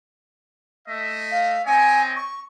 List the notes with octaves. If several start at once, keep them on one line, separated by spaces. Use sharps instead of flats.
A3 D#5 E5
F5
C4 C#5 D#5 G#5
C#6